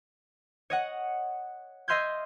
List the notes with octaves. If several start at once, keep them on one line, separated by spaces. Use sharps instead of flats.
C#5 D#5 F#5
D#5 E5 C6 F6 G6 G#6